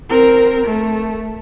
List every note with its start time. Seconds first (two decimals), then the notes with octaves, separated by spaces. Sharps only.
0.10 C4 A#4
0.66 A3